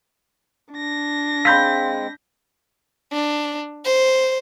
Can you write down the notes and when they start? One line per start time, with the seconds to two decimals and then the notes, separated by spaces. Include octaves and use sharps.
0.73 D4 A#6
1.45 G#3 C4 F5 B5 C6 G6 B6
3.12 D4
3.85 C5